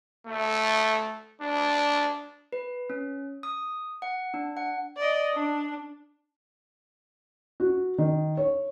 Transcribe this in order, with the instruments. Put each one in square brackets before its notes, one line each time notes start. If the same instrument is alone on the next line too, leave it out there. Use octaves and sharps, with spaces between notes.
[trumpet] A3
D4
[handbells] B4
C#4
D#6
F#5
D4
F#5
[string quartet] D5 D#5
D4
[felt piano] F#4
D#3
C#5